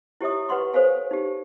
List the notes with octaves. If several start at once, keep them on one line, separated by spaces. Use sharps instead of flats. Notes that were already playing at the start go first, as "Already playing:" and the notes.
E4 G4 C#5 E5 D#6
G4 B4 F#5 C6 C#6
A4 C5 C#5 F5 G#5
D#4 G4